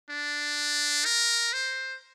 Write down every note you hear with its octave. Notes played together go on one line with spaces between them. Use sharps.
D4
A#4
C5